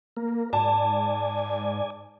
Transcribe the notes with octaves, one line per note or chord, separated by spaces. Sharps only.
A#3 A#4
G#2 D5 G#5 A5